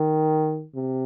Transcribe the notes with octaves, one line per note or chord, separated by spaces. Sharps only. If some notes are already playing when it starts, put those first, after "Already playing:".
Already playing: D#3
C3